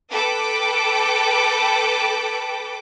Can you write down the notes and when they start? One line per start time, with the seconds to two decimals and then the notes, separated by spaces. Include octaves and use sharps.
0.11 A4 B4 G5 D6